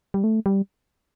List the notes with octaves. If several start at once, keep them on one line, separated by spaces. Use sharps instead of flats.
G3
A3
G3